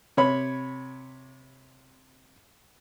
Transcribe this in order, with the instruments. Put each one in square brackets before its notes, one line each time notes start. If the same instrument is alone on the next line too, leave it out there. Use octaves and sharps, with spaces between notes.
[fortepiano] C3 C#5 B5